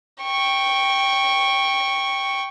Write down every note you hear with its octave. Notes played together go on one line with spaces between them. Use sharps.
G5 C#6